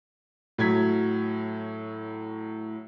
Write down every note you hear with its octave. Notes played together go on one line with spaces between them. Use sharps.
A2 F#3 G#6 B6